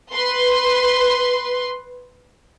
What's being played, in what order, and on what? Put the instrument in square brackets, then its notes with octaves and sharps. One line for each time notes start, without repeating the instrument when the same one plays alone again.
[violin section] B4 C6